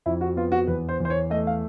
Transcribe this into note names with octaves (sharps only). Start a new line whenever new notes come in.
F2 E4
F#4
B3 F4
F#4
E2 B4
C5
E2
C5
C#5
A3 D#5
F5